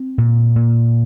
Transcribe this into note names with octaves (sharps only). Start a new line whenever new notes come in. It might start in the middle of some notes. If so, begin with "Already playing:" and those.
Already playing: C4
A#2
A#2